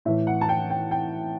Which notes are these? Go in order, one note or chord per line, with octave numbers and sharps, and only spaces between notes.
A2 E3 E5
F#5
A5
G5
G5
G5